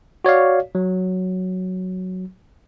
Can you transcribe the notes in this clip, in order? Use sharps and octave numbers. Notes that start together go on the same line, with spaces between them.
F#4 C#5 D5 F5
F#3